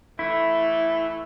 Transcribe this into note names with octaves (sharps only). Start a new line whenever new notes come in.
E3 A3 E4